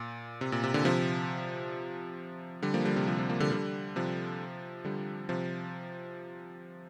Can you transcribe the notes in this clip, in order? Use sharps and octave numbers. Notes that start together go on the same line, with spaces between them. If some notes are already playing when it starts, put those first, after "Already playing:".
Already playing: A#2
C3
A#2
C3
A#2 D3
C3 F3
D3 G3
F3 A#3
D3 G3
C3
C3 F3
C3 F3
F3 A#3
D3 G3
D3 G3
C3 F3
D3 G3
C3 F3